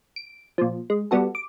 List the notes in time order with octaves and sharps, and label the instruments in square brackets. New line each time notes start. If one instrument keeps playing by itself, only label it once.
[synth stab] D7
A#2 F3
G#3
G3 B3 F#4 A4
D6